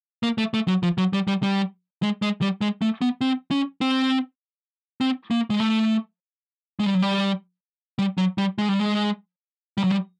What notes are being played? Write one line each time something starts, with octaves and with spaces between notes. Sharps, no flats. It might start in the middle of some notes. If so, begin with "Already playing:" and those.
A#3
A3
A3
F#3
F3
F#3
G3
G3
G3
G#3
G#3
G3
G#3
A3
B3
C4
C#4
C4
C4
A#3
G#3
A3
G#3
G3
F#3
G3
G3
F#3
G3
G#3
G3
G#3
G3
F#3
G3